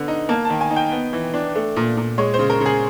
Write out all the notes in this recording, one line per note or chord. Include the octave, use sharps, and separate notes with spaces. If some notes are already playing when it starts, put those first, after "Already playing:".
Already playing: D3 B3
D#4
A#3 A5
D#3 A5
G#5
D#4
G5
B3
E3
D4
A3
A#2
A#2
G#3 C#5
C5
C#3
A#4
C#3
G#4